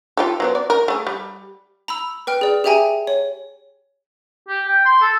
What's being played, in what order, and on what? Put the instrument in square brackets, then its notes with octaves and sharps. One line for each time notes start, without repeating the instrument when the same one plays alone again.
[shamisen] F4 G4 A4
F#3 B3 C4
D5
A#4
A3 G#4
G3
[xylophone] A#5 B5 E6
B4 G5 F6
G#4 D5
G4 G#4 E5 G5 G#5 A#5
C#5
[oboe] G4
G5
C6
A4